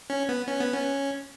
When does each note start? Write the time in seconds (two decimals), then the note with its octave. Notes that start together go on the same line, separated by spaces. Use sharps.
0.10 C#4
0.29 B3
0.48 C#4
0.60 B3
0.73 C#4